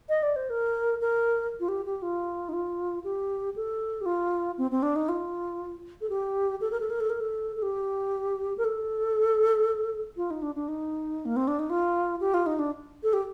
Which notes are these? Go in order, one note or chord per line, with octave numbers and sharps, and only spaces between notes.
D#5
D5
C5
A#4
A#4
F4
G4
G4
F4
D#4
F4
G4
A4
G4
F4
C4
C4
D4
D#4
F4
A4
G4
A4
A#4
A4
A#4
A4
A#4
A4
A4
G4
A#4
A4
F4
D#4
D4
D4
D#4
A#3
C4
D4
D#4
F4
G4
F4
D#4
D4
A4
G4